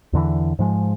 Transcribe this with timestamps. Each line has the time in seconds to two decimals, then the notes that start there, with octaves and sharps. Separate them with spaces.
0.13 E2 D3 E3
0.59 G#2 F3 G#3